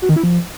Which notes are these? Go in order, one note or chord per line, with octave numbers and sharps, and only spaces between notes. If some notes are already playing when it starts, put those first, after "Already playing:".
F#4
D#3
E4
F3